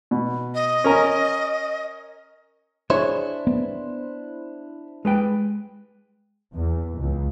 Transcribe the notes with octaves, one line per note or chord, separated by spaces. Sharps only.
B2
D#5
C#4 A#4 A#5
D4 E4 G#4 C5 C#5
B3
G#3 B4 G5
E2
C#2